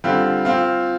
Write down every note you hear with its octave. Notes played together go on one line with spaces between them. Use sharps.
D3 G3 C4 F4
F3 C4 F4